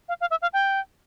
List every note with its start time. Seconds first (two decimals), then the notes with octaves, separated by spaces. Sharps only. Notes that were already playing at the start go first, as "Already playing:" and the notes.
0.08 F5
0.21 F5
0.31 E5
0.42 F5
0.53 G5